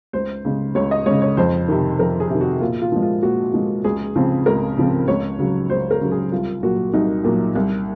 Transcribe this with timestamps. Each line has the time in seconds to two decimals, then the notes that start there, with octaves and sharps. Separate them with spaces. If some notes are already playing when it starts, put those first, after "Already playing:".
0.13 C#2 C5
0.45 C#3 G#3
0.75 C#2 C#5
0.91 D#5
1.06 C#3 G#3 C#5
1.22 C#5
1.37 F2 C5
1.68 C3 D#3
1.99 F2 A#4
2.20 G#4
2.30 C3 D#3
2.41 F#4
2.61 A#2 F4
2.82 F4
2.92 F3 G#3
3.02 F4
3.23 A#2 F#4
3.54 F3 G#3
3.84 C#2 G#4
4.16 C#3 F3 C4
4.46 C#2 A#4
4.77 C#3 F3 C4
5.08 C#2 C#5
5.39 C#3 F#3
5.70 C#2 C5
5.91 A#4
6.01 C#3 F#3
6.12 G#4
6.32 C2 F4
6.63 A#2 F#3 F#4
6.93 C2 D#4
7.24 A#2 F#3
7.55 C2